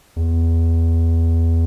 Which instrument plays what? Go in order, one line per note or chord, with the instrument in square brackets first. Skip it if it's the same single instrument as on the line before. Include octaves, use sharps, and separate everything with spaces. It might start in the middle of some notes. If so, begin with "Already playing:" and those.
[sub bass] E2